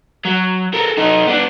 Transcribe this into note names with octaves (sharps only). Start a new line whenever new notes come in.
F#3
A4 A#4
D#4 A4
B3 D4